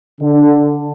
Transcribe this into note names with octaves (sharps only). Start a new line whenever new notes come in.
D3